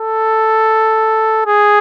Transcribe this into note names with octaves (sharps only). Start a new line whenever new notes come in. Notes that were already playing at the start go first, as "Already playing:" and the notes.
Already playing: A4
G#4